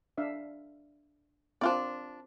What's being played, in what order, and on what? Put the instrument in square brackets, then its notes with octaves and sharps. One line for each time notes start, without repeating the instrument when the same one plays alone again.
[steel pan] D4 E5 F5
[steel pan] C4 A#4 [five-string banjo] D4 F4 D5